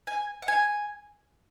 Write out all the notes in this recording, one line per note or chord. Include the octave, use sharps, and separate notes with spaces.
G#5
F#5
G#5